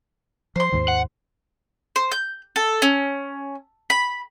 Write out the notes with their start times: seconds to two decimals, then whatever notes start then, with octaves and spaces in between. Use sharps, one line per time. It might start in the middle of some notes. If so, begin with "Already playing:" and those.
0.56 F3 C5 C6
0.72 D#2 G#2 D#3
0.88 F#5
1.96 C5
2.12 G6
2.56 A4
2.82 C#4
3.90 B5